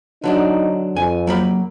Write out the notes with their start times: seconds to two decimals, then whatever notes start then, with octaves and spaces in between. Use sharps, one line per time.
0.24 D3 F#3 D4 D#4
0.96 F2 G#5
1.27 F#3 A#3 B5